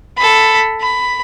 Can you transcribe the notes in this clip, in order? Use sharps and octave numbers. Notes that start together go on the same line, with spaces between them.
A4 B5
B5